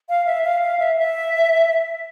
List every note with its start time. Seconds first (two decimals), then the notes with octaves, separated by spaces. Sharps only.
0.09 F5
0.26 E5
0.44 F5
0.63 F5
0.79 E5
0.98 E5